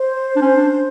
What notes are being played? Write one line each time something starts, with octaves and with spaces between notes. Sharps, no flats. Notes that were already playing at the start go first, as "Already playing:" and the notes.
Already playing: C5
D4
C#4
D4